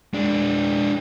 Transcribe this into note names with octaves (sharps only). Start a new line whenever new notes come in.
G#3 D4